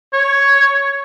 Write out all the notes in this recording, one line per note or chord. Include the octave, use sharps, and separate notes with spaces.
C#5